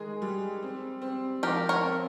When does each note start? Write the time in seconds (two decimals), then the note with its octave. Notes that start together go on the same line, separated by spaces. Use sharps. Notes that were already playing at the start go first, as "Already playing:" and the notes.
Already playing: D#3 G#3 G#4 A#4
0.22 G3
0.63 C4
1.02 C4
1.43 F3 G4 A#4
1.69 A#4 C#5
1.83 C4